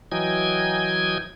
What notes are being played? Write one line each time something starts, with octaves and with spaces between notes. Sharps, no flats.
E3 F#3 D#5 G5 G#5 G#6